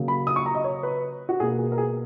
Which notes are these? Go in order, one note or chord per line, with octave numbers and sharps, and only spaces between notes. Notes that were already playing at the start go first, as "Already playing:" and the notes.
Already playing: C#3 F#3 A#3
B5
D#6
C#6
A#5
D#5
C#5
B4
F#4
B2 A#3 G#4
G#4
A#4
G#4